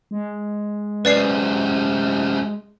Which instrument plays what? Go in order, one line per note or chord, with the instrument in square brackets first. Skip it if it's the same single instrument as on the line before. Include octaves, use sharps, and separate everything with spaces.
[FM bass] G#3
[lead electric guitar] F#2 C3 [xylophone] B4 D5 C7